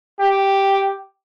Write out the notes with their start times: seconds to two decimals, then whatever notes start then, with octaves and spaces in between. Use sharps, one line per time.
0.20 G4